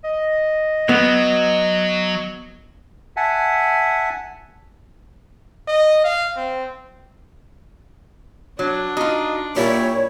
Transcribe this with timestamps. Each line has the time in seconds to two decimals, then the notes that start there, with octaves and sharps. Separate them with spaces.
0.04 D#5
0.89 F#3 B3
3.16 E5 F#5 G#5 A5
5.68 D#5
6.04 F5
6.36 C4
8.59 F#3 D4
8.97 D#4 F4 F#4
9.56 A#2 G3 E4 C#5